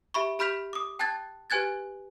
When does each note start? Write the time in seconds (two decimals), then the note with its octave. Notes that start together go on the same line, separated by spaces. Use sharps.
0.14 G4 E5 B5 C#6
0.39 G4 B5 F6 G6 B6 F7
0.73 D6 D#6
0.99 G5 A5 F#6 G#6 A6
1.50 G4 B4 G#5 F#6 G#6 A6